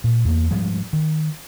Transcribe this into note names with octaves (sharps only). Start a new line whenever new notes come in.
A#2
E2 A#3
G#2 F3 G3 G#3
D#3